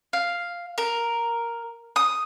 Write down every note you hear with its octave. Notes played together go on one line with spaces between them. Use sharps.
F5
A#4
D#6